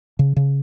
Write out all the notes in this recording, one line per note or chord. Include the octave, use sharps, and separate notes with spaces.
C#3
C#3